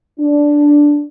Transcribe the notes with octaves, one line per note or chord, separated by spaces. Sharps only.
D4